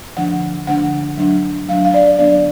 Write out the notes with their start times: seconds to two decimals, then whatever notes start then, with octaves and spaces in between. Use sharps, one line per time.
0.17 D3 F3 A3 D4 F#5
0.67 D3 F3 A3 D4 F#5
1.18 F#3 A3 D4
1.68 F#3 A3 D4 F5
1.85 F5
1.94 D5
2.19 D3 F#3 B3 D4 D5